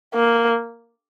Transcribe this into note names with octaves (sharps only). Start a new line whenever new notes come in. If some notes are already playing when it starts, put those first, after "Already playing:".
A#3